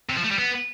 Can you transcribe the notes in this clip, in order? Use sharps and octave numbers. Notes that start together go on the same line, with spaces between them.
C3
F3
A3
G3
B3